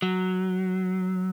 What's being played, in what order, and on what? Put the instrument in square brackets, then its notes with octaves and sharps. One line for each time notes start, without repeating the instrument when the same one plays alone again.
[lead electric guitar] F#3